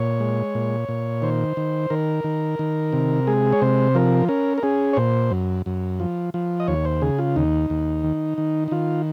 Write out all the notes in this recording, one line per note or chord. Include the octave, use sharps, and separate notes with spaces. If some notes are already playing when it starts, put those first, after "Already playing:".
Already playing: A#2 C#5
G#3
A#2
A#2
D#3 C5
D#3
D#3 A#4
D#3
D#3
C3
G#3 G#4
C#5
C3 C5
F3 A#4
C#4 A#4
A#4
C#4 G#4
C#5
A#2 C5
F#2
F#2
F3
F3
D#5
D#2 C#5
C5
C#3 G#4
F4
D#2 D#4
D#2
D#3
D#3
D#4
D#3 F4